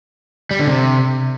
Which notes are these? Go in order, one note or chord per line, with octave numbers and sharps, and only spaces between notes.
G3
D3
C3